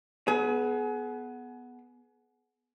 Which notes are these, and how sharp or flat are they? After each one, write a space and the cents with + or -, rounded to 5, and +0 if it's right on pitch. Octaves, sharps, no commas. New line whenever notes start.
B3 +0 G#4 +35